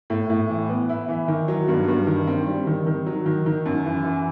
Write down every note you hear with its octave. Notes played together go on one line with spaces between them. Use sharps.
A2
A2
E3
B3
E4
E3
D#3
F#3
G2
G2
D#3
C4
G3
D#3
D#3
F#3
D#3
D#3
F#2
E3
E3